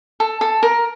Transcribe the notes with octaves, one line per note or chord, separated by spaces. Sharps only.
A4
A4
A#4